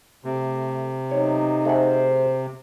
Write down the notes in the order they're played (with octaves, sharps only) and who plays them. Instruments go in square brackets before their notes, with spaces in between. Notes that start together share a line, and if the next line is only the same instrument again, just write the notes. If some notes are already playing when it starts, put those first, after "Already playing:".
[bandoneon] C3 [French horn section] A3
[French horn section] B2 F#3 A3 [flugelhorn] D#4 [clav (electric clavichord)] C#5
[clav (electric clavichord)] A3 G#4 F#5 [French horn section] C5